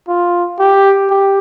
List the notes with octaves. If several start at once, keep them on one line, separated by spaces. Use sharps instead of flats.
F4
G4
G4